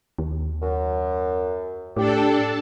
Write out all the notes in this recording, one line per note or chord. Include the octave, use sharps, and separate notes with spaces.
D#2
F#2
A2 D4 G4 A4 A5